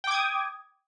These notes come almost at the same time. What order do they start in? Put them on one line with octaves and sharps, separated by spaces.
G5 D6 G#6 D#6